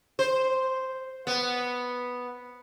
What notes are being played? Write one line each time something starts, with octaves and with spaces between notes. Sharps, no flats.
C5
B3